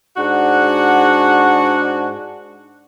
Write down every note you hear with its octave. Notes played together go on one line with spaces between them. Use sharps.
G#2 D4 F#4 F#5